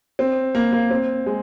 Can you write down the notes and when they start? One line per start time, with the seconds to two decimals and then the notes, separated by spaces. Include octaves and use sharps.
0.19 C4
0.55 A#3
0.73 A#3
0.91 C4
1.26 G#3